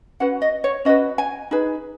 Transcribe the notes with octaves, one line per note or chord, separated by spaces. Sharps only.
C#4 F#4 B4 F#5
D#5
C#5
C#4 F#4 B4 D#5
G#5
D#4 G#4 B4